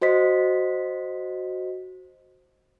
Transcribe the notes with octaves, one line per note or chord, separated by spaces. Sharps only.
F#4 C5 D#5 B6